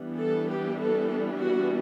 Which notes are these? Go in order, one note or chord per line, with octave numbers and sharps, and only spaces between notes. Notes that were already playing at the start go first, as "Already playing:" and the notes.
Already playing: E3 G3 B3 D4
A4
G4
A4
F#4